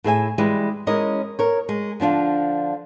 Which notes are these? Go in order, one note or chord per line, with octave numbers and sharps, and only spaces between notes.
A2 G#4 E5 G#5
E3 G3 G#3
G#3 C#4 E4 A#4 D#5
A#4 C#5
G#3
D3 F3 D4 F4